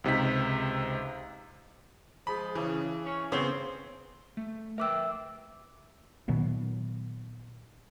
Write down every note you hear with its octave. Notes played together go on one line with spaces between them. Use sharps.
C#2 C3 D#4 B6
F3 G#3 B5
C#3 E3
C#4
C#3 B3 C4 C#5
A3
A#4 B4 E5 G5 D6 E6
A#2 D#3 F#3 B3